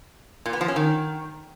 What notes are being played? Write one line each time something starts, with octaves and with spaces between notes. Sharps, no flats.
A#2
B3
F3
C#4
D#3